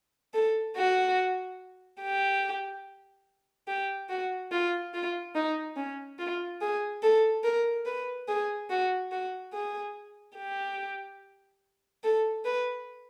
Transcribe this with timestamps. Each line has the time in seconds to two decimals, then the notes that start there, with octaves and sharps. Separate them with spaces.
0.34 A4
0.76 F#4
2.02 G4
3.68 G4
4.09 F#4
4.52 F4
4.94 F4
5.35 D#4
5.77 C#4
6.19 F4
6.61 G#4
7.03 A4
7.44 A#4
7.86 B4
8.28 G#4
8.70 F#4
9.12 F#4
9.53 G#4
10.37 G4
12.04 A4
12.45 B4